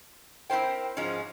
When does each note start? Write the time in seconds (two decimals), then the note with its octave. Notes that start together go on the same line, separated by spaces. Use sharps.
0.50 C4 E4 A#4 C5 G5
0.97 G#2 F3 G#3 C#4